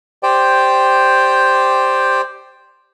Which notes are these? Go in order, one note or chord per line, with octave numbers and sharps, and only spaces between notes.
G4 C5 D5 G5